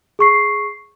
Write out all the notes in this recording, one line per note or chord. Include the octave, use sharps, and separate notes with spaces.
G#4 C#6 C7